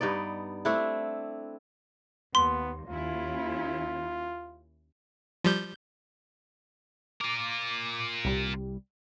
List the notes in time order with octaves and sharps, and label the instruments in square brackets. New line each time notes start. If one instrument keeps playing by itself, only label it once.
[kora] G2 B3 D#4 D5
A3 C4 D4 E4
[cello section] D#2 [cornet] B3 [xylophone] C6
[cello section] D#2 C#4 E4 [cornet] F4
[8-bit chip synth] F3 G3 G6
[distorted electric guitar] F4 A#4 [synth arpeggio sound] D6
[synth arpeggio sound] C2 G3